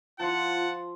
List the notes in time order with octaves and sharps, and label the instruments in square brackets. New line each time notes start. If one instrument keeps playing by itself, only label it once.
[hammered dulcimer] F3 C6 [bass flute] F4 [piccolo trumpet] F#5 [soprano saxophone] A5